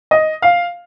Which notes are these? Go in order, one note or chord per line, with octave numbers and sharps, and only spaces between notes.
D#5
F5